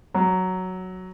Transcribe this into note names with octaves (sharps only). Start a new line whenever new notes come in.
F#3